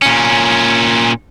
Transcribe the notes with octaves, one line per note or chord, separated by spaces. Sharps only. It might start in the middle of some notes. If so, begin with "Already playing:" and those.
A#2 C#4